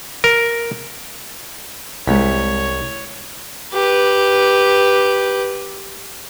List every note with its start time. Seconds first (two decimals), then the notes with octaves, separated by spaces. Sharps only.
0.24 A#4
2.07 C2 G#3 C#5 B6
3.74 G4 B4